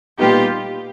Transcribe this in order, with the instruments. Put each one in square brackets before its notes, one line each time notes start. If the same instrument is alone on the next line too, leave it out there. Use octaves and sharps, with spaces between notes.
[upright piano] A#2 G3 B3 D#4 [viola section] F4 G4